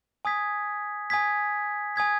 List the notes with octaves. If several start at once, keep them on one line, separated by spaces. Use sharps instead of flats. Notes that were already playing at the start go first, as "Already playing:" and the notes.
G#5 D#6 G#6 B6
G#5 D#6 G#6 B6
G#5 D#6 G#6 B6